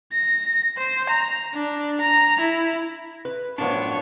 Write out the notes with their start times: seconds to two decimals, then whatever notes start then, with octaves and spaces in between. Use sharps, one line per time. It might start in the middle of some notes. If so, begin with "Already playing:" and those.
0.13 A#6
0.78 C5
1.10 A#5
1.54 D4
2.01 A#5
2.41 E4
3.25 B4
3.58 F#2 A2 F3 B3 D4 B4 C#5